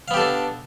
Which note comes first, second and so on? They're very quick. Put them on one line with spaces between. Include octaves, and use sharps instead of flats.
F5 B3 G4 A4 D4